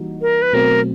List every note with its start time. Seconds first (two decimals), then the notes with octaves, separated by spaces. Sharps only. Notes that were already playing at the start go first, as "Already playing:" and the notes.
Already playing: E3 G3 A#3 D#4 F#4
0.21 A#4
0.42 B4
0.53 B2 F#3 A3 C4 A#4